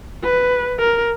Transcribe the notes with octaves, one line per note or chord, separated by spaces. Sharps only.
B4
A#4